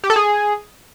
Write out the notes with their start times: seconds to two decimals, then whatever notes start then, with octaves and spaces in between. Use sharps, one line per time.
0.04 G4
0.10 A4
0.16 G#4